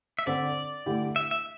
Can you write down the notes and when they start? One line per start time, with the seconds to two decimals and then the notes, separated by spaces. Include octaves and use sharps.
0.19 E5
0.26 D3 C4 A4 D5
0.86 D3 A3 E4 G4
1.16 E5
1.31 E5